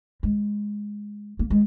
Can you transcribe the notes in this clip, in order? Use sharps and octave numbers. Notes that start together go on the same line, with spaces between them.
G#3
A#3
G#3